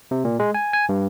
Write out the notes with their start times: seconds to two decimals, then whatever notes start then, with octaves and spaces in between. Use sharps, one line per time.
0.11 C3
0.25 A#2
0.40 G#3
0.54 G#5
0.73 G#5
0.89 G2